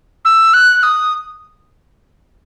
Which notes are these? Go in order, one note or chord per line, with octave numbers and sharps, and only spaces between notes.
E6
F#6
D#6